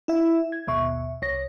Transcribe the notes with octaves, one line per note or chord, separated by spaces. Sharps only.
E4 E5
G#6
G#1 D#2 B2 E5 C#6
C2 C#5 A#6